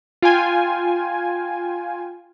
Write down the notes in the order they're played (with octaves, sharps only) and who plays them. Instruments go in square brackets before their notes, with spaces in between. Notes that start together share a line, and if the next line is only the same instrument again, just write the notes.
[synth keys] F4 G5 G#5 G#6